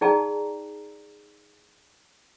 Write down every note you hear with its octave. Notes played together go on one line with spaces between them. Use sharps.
D#4 G#4 D5 G5 A5 A#5